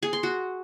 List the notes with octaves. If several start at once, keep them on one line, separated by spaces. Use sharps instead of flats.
G#4
C6
F#4